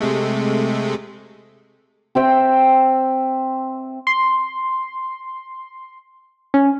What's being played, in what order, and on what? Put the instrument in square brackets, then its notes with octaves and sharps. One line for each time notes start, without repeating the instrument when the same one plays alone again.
[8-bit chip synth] C3 G#3 A3
[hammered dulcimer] C4 E5 G5
[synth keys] C6
C#4